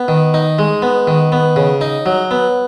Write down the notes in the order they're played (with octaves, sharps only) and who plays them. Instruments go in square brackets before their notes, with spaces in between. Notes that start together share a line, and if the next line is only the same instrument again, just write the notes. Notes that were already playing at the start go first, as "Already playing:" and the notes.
Already playing: [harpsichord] B3
D#3
D#4
G#3
B3
D#3
B3
C#3
D#4
F#3
B3